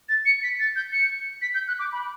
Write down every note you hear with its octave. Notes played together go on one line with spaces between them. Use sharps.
A6
C#7
B6
A6
G6
C#7
B6
G6
F#6
D6
B5